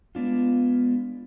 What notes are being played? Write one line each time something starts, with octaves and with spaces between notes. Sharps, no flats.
G#3 B3 D4 F4